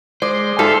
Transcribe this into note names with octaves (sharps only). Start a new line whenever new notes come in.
G#3 C5 D5
G#2 A4 E5 F5 C6